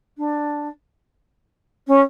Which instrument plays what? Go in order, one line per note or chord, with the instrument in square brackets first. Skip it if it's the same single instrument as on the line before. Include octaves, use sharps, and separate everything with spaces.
[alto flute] D4
C#4